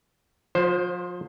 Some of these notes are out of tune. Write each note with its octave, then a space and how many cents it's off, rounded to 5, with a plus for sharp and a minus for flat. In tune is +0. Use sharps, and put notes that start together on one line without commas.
F3 +35 C5 +5